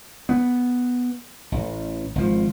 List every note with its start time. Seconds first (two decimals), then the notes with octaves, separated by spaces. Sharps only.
0.29 B3
1.52 A1
2.15 G#1 F3